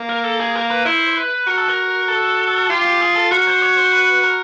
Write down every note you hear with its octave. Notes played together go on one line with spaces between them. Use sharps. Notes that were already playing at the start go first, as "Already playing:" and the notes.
Already playing: A#3
A#4
A4
G#4
A#4
B4
E4 C5
B4
F#4 A#4
A4
A#4
A4
F4 G4
G4
G#4
A4
F#4 A#4
C5
C#5
C5
B4
A#4